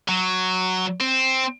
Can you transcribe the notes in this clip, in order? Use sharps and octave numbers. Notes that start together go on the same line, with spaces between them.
F#3
C4